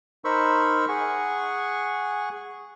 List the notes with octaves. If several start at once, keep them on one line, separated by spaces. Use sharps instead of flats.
D#4 A#4 C5 B5 C#6 E6
G#4 F#5 G#5 C#6